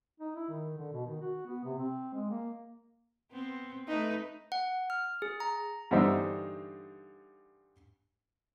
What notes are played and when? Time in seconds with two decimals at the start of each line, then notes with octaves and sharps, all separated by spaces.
0.20 D#4
0.36 E4
0.49 D#3
0.78 D3
0.93 B2
1.06 D#3
1.21 F#4
1.46 B3
1.65 C3
1.79 C4
2.14 G#3
2.31 A#3
3.32 B3 C4
3.88 A3 D#4 B4
4.52 F#5
4.90 F6
5.22 G#4
5.40 A#5
5.91 G2 D3 E3 D#4 C5 E5